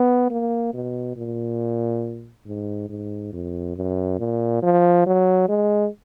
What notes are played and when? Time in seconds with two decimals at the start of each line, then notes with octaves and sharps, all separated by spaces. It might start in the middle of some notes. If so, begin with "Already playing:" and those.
Already playing: B3
0.30 A#3
0.74 B2
1.17 A#2
2.47 G#2
2.89 G#2
3.33 F2
3.76 F#2
4.20 A#2
4.63 F3
5.06 F#3
5.49 G#3